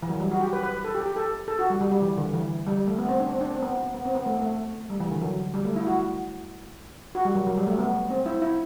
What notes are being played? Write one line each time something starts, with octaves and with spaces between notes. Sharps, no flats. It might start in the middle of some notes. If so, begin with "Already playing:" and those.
E3
F#3
G3
F#4
G4
B4
B4
A4
G4
G4
A4
A4
F#4
G3
G3
G3
E3
D3
E3
G3
G3
A3
B3
C4
D4
C4
D4
C4
B3
B3
C4
B3
A3
A3
G3
E3
D3
F#3
G3
A3
E4
F#4
F#4
G3
F#3
F#3
G3
A3
B3
C4
E4
E4